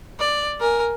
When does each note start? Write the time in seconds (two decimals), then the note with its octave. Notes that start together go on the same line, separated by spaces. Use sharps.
0.19 D5
0.60 A#4 G#5